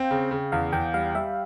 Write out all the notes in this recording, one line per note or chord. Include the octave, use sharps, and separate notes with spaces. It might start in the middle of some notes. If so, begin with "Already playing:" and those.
Already playing: C4 F5 G5
C#3
C#3
E2 F5
E2 G5
G3 F5
G3 E5